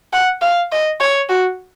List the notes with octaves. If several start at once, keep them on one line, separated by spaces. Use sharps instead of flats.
F#5
F5
D#5
C#5
F#4